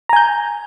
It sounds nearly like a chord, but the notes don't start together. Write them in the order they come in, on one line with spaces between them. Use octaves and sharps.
A#5 G#5 G6